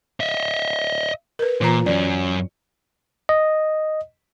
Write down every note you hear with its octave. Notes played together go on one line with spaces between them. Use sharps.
D#5 E5
A#4 B4
A#2 E3 F4 A#5
F#2 C#4 D5
D#5